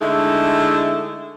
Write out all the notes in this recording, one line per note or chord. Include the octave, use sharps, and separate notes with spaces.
D3 G#3 A3 D#4 E4